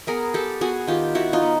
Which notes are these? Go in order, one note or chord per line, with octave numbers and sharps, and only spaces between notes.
B3 G#4 A#4
B3 G4 A4
B3 F#4 G#4
D#3 F4 G4
D#3 E4 F#4
D#4 F4
B3